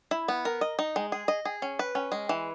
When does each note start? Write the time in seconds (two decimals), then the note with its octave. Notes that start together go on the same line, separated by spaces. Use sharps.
0.11 E4
0.28 B3
0.45 A#4
0.61 D#5
0.79 D#4
0.96 G#3
1.12 G#4
1.28 D#5
1.45 G#4
1.62 C#4
1.79 B4
1.95 C#4
2.12 G#3
2.29 E3